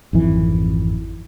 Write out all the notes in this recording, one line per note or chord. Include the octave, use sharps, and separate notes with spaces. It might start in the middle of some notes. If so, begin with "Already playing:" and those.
G#1 F2 E3